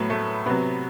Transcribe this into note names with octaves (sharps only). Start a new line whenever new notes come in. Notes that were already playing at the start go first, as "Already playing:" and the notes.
Already playing: A2 F#3 B3
A3
C3 F#3 B3